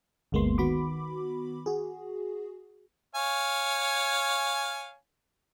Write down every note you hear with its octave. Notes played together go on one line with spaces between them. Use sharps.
G1 D2 G#3 A#3 B3 C6
D#3 B3 F#4 B5 D6
F#4 G#4
C#5 F5 G#5